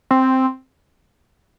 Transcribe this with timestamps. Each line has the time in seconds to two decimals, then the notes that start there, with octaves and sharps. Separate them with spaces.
0.11 C4